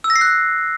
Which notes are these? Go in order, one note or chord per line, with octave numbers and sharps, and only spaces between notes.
E6
A#6
C7
F#6